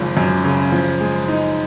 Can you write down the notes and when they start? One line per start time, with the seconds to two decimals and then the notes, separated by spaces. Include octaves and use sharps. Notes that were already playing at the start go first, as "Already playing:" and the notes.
Already playing: G#1 F#2 C#3 F3
0.17 F#2
0.45 C#3
0.72 F3
1.01 G#3
1.28 D#4